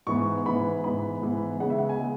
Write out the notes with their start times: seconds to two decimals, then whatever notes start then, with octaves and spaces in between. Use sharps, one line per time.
0.07 G#2 E3 B3 C#6
0.45 G#2 E3 B3 B5
0.84 G#2 E3 B3 B5
1.21 G#2 E3 B3
1.60 C#3 G#3 B3 F#5
1.70 E5
1.79 F#5
1.89 G#5
1.99 C#3 G#3 B3